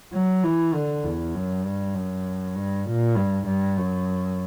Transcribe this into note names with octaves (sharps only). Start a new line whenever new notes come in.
F#3
E3
D3
E2
F#2
G2
F#2
G2
A#2
G2
G2
F#2